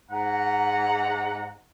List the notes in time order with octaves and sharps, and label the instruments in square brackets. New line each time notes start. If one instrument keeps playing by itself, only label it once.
[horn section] G#2 F#5 A#5